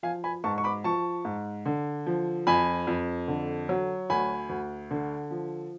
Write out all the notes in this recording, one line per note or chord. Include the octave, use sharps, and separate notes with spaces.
F3 F5 G#5
G#5 B5
G#2 A5 C#6
C#6
B5 D6
F3 A5 C#6
G#2
D3
F3
F2 G#5 B5
F2
D3
F#3
D2 G#5 B5
D2
D3
F3